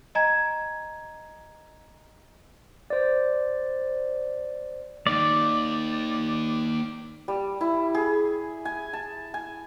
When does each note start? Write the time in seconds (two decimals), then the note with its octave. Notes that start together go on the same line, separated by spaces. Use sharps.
0.15 D#5 G#5 A#5 G#6
2.90 C5 D5
5.07 A#3 D#4 D5
7.28 G3
7.61 E4
7.95 G#4
8.65 G#5
8.93 A5
9.34 G#5